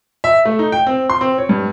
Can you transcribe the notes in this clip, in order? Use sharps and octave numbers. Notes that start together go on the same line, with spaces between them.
E5
A3
D#4
G5
C4
C6
C4
C#5
G2